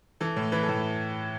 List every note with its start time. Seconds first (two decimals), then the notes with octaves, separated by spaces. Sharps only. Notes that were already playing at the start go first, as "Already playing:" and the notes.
0.20 E3 A4
0.36 A2
0.52 E3 B4
0.63 A4
0.68 A2